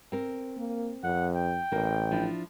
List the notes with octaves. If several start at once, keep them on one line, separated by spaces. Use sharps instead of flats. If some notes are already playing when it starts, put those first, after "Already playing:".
C4 A#4
A#3
F2 F#5
G5
A1 A#3 A#4
F3 D4 E4